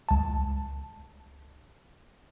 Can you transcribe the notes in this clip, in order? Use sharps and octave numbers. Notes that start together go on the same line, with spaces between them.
C#2 A5